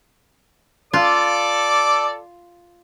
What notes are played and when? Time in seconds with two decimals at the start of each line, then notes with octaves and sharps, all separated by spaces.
0.93 F4 A4 D5 D6